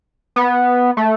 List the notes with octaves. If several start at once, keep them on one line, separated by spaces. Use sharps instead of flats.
B3
A3